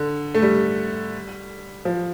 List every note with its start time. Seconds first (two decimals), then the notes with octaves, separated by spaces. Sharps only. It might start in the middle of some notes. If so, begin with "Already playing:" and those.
Already playing: D3
0.35 A3
0.42 G3
1.85 F3